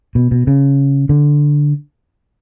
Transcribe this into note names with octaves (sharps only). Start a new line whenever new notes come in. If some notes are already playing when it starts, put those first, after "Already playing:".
B2
B2
C#3
D3